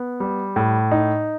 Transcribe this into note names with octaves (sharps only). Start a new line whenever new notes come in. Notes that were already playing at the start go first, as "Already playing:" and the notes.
Already playing: B3
G3
A2
D#4